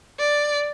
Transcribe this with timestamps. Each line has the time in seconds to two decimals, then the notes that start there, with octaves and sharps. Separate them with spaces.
0.20 D5